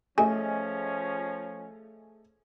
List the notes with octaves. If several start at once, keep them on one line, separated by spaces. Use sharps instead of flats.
F3 A3 C#4 G#4 D#5 G#5